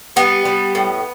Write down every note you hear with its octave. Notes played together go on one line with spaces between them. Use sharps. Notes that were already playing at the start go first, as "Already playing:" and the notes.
G3 B3
G3
A2